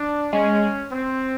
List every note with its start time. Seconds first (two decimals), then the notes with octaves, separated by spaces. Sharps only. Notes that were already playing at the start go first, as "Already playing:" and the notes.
Already playing: D4
0.33 G#3 C#4
0.90 C4